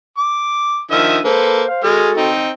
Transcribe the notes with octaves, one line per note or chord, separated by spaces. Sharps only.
D6
D#3 F3 D4 E5 D#6 E6
A#3 A4 B4 C5
C5 F5
G#3 F#4 G#4 A4 F6
C4 D#4